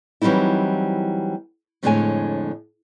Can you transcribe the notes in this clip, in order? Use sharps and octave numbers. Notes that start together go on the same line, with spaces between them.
E3 F#3 G3 C4 D#4 E4
F2 A2 D3 G#3 C#5 G#5